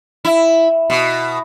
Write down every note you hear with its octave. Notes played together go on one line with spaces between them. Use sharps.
E4
B2